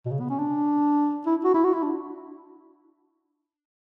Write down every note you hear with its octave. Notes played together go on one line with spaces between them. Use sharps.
B2
C#3
B3
C#4
D4
E4
F#4
E4
F#4
E4
D4